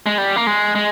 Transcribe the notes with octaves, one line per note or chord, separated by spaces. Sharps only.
G#3
G3
A#3
G#3
G#3